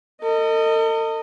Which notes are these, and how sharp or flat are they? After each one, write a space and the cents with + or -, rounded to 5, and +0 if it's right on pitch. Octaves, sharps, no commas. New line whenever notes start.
A4 +45 D#5 -5